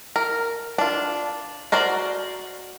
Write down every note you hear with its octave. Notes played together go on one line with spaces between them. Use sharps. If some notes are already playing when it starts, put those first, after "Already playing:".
A#4
D4 F4
F#4 A#4 C5 D5